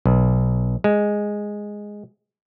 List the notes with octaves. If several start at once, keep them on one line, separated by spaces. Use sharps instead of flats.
B1
G#3